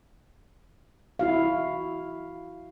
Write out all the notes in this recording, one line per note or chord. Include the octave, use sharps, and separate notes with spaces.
E4 F#4 F5